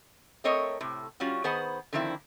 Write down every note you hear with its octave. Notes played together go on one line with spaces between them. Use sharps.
A3 C4 A#4 C#5 D#5
A2 C3
G3 C#4 F4 F#4
D#3 B3 G#4 B4 C5 F#5
D3 D#3 F3 C4 E4